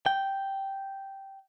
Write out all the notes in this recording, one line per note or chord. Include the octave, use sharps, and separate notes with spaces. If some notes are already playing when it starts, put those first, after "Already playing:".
G5